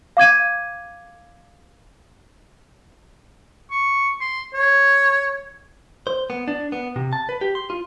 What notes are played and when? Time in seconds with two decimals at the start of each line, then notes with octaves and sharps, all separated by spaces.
0.17 F5 D6 G#6 D#7
3.71 C#6
4.21 C6
4.54 C#5
6.07 C5
6.30 B3
6.48 D4
6.72 B3
6.96 C3
7.13 A5
7.29 B4
7.41 G4
7.55 C6
7.70 F4